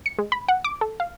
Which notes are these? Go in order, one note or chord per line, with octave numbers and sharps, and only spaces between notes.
C#7
G#3
B5
F#5
D6
A4
F5